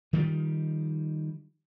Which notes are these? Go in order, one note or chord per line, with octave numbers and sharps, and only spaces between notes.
D#3 F3 G3